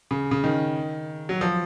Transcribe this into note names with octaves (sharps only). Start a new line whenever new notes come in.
C#3
C#3
D#3
F#3
F3